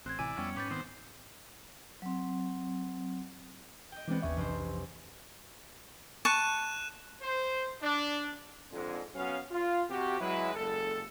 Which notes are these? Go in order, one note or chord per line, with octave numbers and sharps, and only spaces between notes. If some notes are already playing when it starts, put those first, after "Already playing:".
A1 C4 F#6 G#6
A1 C3 E3 E4 D5 G#5
F2 G3 B3 C#4 G5
G#2 B4 C#5 D6 G6 A6
D#3 B3 C4 C5
F#3 C4
D#5 G5
E3 G#3 B3 C4 D4
G1 D#2 C#4 G#4 E5
F1 B1 E3 C5
A5 C#6 F#6 D#7 E7
C5
D4
F2 G#2 D3 G#3
F#3 B3 C#4 F5
F4
C3 F#4 G4
F#3 G#3 E4 B4
F#1 G#3 A4